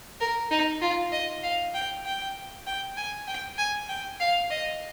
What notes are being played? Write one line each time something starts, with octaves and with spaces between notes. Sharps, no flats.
A#4
D#4
F4
D#5
F5
G5
G5
G5
G#5
G5
G#5
G5
F5
D#5